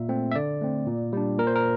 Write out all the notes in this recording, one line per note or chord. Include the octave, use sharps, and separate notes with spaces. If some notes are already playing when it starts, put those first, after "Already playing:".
Already playing: A#2 E5
A3 C4
E5
D3 D5
A3 C4
A#2
G3 D4
A#2 A#4
C5
A#4